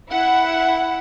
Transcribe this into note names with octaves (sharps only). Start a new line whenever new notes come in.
E4 F#5